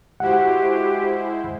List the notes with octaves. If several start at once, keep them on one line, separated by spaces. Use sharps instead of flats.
G#3 E4 F#4 G4 C5 F#5